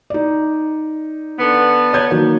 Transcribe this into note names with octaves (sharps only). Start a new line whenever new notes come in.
D#4 D5
D3 B3
C#5 G6 G#6
D#3 F#3 A#3